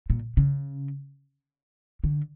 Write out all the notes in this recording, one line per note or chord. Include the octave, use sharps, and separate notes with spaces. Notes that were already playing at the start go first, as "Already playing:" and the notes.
A#2
C#3
D3